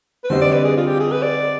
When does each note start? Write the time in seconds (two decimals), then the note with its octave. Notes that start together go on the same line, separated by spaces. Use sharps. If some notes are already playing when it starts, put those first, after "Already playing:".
0.24 B4
0.29 D3 G3 C4 D#4 C5
0.42 D5
0.52 B4
0.64 G#4
0.77 F4
0.87 G4
1.00 G#4
1.12 B4
1.22 D5